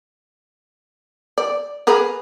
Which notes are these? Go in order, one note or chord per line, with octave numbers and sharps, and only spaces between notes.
D5
G#4 A#4 B4